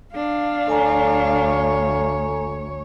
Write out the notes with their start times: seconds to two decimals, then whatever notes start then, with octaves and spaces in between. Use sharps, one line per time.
0.15 D4 F5
0.68 D2 A4 C#5 G#5 A#5